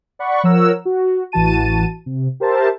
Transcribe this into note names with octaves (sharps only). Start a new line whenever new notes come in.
D5 F#5 B5 C#6
F3 A#4 C#5 F#5 A#5 E6
F#4
A1 E3 F#4 A5 D#7
C3
G4 A#4 C5 E5 A5